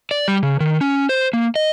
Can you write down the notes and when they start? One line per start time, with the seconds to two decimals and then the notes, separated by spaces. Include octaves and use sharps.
0.11 D5
0.28 G3
0.43 C#3
0.60 D#3
0.81 C#4
1.09 C5
1.33 A#3
1.56 D#5